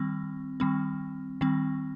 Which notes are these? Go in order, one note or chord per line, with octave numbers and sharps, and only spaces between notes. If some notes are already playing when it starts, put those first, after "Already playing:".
Already playing: D#3 G3 C4
D#3 G3 C4
D#3 G3 C4